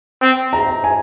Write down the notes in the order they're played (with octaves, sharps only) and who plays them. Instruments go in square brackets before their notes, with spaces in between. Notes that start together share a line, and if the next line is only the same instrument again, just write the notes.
[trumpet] C4
[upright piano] A#5
G#5